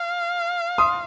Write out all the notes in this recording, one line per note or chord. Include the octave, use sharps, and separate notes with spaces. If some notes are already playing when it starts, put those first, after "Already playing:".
Already playing: F5
C6 D#6